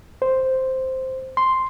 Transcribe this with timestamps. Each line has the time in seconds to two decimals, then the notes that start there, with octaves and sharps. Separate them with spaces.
0.22 C5
1.37 C6